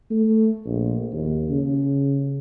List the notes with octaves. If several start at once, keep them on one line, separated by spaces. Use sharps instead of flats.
A3
A#1
D#2
C#3